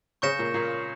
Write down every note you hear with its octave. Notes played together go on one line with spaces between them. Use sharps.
C#3 C#4 C#6 G6 A#6 C#7 E7
A#2 A#3
A#2 A#3